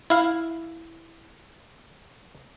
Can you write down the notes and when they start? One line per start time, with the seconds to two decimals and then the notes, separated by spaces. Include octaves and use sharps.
0.10 E4 F5